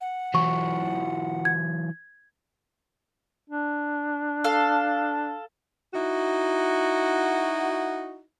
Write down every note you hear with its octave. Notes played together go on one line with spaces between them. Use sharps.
F#5
E3 F#3 C#6
G#6
D4
A4 F5
D#4 E4 F#4